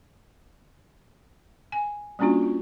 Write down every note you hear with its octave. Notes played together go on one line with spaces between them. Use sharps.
G#5
G3 A#3 C#4 D4 F4 F#4
F4